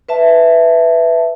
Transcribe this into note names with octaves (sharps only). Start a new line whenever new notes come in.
B4 E5 A5